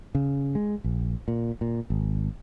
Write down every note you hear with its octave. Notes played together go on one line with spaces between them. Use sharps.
C#3
G#3
A#1
A#2
A#2
G#1